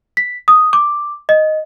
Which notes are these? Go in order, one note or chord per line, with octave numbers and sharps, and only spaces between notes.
B6
D#6
D6
D#5